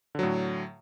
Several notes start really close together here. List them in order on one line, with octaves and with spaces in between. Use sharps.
D3 F#3 A2